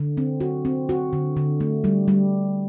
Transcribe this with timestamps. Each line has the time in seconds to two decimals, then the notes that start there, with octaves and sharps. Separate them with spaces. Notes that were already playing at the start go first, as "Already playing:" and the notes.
Already playing: D3
0.17 C4
0.40 F#4
0.65 C4
0.89 F#4
1.13 D3
1.37 D3
1.60 A3
1.84 G3
2.08 G3